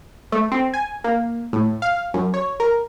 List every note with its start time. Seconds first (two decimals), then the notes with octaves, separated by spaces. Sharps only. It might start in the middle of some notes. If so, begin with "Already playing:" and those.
0.32 A3
0.52 C4
0.74 G#5
1.04 A#3
1.53 A2
1.82 F5
2.14 F#2
2.34 C#5
2.60 A#4